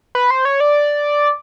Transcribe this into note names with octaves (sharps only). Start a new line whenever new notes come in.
B4
C5
C#5
D5